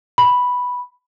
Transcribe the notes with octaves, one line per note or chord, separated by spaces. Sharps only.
B5